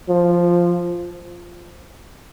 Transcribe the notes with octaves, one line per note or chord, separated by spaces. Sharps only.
F3